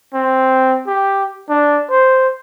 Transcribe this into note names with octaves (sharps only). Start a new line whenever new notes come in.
C4
G4
D4
C5